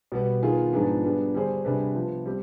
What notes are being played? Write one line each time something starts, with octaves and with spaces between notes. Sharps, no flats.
B2 G3 B3
D#3 B3 F4 G#4
G#2 F3 B3 D4 G#4
G3 B3 D4 G#4
D3 G3 D4 G#4 C5
C3 G3 D4 G#4 B4
F3 B3 F4
G3 C4 G4